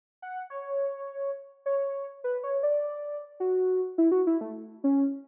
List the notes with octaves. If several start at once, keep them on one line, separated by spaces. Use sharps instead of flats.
F#5
C#5
C#5
B4
C#5
D5
F#4
E4
F#4
E4
A3
C#4